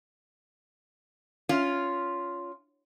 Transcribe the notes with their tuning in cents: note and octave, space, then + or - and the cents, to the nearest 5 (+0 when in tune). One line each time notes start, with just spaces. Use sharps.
C#4 +15 F4 +0